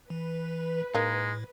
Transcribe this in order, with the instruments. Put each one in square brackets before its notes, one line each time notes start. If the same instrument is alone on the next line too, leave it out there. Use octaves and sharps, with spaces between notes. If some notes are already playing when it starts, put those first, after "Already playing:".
[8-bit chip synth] E3 [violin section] B4
[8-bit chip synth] A2 [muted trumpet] G#3 [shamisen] A#3 D#4